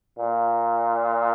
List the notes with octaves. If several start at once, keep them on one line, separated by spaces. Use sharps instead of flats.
A#2